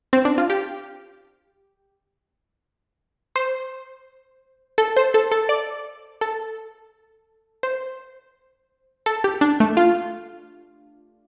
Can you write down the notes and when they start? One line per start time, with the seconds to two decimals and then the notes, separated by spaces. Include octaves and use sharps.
0.13 C4
0.25 D4
0.38 F4
0.50 G4
3.36 C5
4.78 A4
4.97 C5
5.14 A4
5.31 A4
5.49 D5
6.21 A4
7.63 C5
9.06 A4
9.24 G4
9.41 D4
9.60 A3
9.77 F4